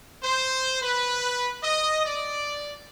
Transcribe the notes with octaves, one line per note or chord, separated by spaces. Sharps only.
C5
B4
D#5
D5